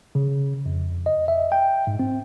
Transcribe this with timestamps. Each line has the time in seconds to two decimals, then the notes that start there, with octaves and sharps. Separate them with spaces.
0.15 C#3
0.66 F2
1.06 D#5
1.28 E5
1.52 G5
1.87 G#2
1.99 C4